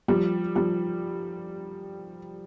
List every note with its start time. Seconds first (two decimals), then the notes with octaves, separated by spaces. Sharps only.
0.08 F3 G3
0.55 F3 G3